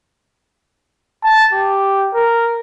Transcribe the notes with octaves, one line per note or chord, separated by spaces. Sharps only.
A5
G4
A#4